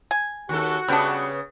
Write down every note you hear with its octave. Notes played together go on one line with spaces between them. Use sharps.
G#5
D#2 F#4 A4
C#3 G3 B3 D4